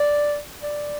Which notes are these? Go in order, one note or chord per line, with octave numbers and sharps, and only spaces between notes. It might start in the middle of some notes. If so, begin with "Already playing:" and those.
Already playing: D5
D5